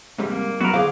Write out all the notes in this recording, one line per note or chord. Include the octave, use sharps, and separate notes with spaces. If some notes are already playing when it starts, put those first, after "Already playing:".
G#2 C3 G3
A#3
F#3 B3 F#4 A#4
D3 G#4 C5 F5 D6